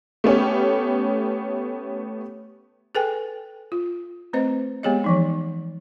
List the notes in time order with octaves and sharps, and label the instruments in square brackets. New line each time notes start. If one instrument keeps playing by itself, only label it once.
[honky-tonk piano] A3 B3 C#4 G4
[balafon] G#4 A4 B4 G5 G#5
F4
A3 C4 B4 C5 D#5
G#3 B3 G4 G#4 C#5 D#5
E3 F3 D#4